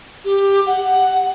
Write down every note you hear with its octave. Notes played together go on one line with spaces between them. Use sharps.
G4
F#5